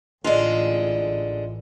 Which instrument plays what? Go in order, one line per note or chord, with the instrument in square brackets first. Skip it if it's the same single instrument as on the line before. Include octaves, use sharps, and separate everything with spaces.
[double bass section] A1 [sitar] D3 G#3 [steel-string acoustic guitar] F4 D#5